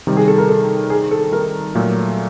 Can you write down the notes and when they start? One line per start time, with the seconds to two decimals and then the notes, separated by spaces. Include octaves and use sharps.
0.07 C3 D#3 G3
0.17 G#4
0.28 A4
0.38 A#4
0.49 A4
0.90 G#4
1.11 A4
1.32 A#4
1.75 A#2 F#3 A3